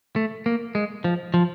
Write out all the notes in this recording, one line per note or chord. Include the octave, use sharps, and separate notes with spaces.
A3
A#3
G#3
F3
F3